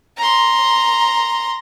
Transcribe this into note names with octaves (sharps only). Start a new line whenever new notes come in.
A#5 C6